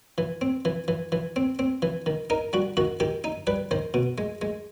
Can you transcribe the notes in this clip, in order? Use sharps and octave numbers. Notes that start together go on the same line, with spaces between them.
E3
C4
E3
E3
E3
C4
C4
E3
D#3
D#4 A#4
G3 F#4
D#3 F#4
D#3 G4
D#4
G3 B4
D#3 C5
B2
G#3
G#3